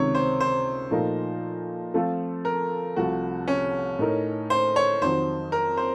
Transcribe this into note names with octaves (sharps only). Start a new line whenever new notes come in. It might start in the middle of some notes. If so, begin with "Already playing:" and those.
Already playing: C#2 C3 D#3 C#5
C5
C5
A#2 F3 A3 D#4 A#4
F3 A3 C4 F4 A4
A#4
C2 C3 F3 A3 F#4
C#4
A2 A3 D#4 A#4
C5
C#5
F2 D#3 F#3 C5
A#4
C5